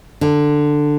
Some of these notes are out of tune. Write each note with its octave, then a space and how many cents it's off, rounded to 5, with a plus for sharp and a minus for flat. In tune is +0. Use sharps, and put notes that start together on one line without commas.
D3 +10